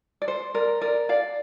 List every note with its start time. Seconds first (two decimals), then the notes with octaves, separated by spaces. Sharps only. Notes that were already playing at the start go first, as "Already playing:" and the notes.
0.22 D5
0.28 C5
0.54 A#4 D5
0.81 A#4 D5
1.09 D5 F5